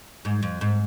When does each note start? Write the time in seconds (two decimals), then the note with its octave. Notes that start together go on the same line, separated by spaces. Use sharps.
0.25 G#2
0.43 F2
0.61 G#2